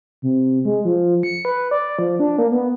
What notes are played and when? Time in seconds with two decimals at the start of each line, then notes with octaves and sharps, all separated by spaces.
0.22 C3
0.65 G#3
0.85 F3
1.23 C#7
1.45 B4
1.71 D5
1.99 F3
2.20 D4
2.38 A#3
2.52 B3